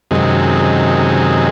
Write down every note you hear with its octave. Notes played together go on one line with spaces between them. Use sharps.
F#2 C3 D#3 G#3